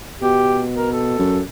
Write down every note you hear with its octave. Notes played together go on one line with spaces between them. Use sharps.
B2 G4
A#4
A4
F#2